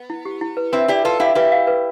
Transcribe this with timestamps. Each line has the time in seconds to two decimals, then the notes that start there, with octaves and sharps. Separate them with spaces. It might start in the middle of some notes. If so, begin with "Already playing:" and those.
Already playing: B3
0.10 E4
0.25 G4
0.41 E4
0.57 B4
0.72 C4 E4 B4
0.88 E4 G4 D5
1.04 F4 A4 B4
1.20 E4 G4 F5
1.35 E4 G4 B4
1.52 F5
1.67 B4